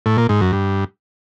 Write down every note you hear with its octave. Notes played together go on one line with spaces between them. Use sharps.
A2
A#2
G#2
F#2
G2